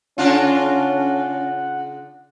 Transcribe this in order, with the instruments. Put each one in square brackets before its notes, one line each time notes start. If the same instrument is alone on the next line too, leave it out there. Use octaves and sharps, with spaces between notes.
[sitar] C#3 D4 F4 [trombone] C#4 [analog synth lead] F#5